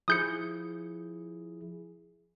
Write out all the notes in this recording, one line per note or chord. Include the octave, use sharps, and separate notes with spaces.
F3 E4 G#4 D#6 G6 C#7